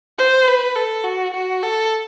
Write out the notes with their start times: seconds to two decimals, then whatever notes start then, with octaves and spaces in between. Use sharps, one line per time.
0.18 C5
0.47 B4
0.76 A4
1.04 F#4
1.33 F#4
1.63 A4